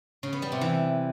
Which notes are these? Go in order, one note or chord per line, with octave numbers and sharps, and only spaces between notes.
C#3
B3
G3
C3
E3